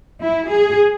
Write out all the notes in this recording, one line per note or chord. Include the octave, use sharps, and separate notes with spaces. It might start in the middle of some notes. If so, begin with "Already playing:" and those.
E4
G#4